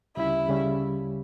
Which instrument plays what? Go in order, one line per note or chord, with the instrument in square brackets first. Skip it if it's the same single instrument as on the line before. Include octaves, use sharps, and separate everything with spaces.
[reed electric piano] D2 C#3 G3 C#4 G4 [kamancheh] E4
[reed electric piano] C#3 G3 C#4 G4